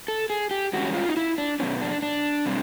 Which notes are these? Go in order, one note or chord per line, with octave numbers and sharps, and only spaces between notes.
A4
G#4
G4
G2 E3 G#3 C#4 F#4
F4
D#4
E4
D4
B2 F#3 B3 C#4
D4
D4
B2 G3 C4